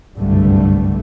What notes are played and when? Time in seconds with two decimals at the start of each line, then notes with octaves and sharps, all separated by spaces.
0.16 F#1 C2 G2 D3 G3 A3